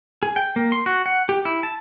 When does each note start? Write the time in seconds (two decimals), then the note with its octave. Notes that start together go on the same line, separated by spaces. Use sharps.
0.23 G#4
0.36 G5
0.56 A#3
0.72 C6
0.86 F#4
1.06 F#5
1.29 G4
1.45 E4
1.63 A5